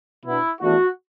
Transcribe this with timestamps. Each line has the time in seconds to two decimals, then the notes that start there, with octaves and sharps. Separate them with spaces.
0.24 B2 B3 D4 E4
0.61 E2 E3 A3 D4 F#4